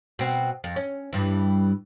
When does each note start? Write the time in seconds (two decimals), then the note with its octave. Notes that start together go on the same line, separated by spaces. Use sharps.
0.19 B2 C4
0.64 F2
0.76 C#4
1.13 G2 E3